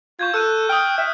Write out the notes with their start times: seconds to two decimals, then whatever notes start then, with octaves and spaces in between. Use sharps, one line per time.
0.19 F4 C#6 G6 G#6
0.34 A4 E6 F#6 D#7
0.69 G5 D#6 F6
0.98 E5 F6